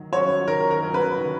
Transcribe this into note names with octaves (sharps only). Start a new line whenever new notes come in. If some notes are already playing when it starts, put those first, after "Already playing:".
Already playing: D#3 F#3
F#3 C#4 C#5
D#3 A#4
A#4
F#3 C#4
B4
D#3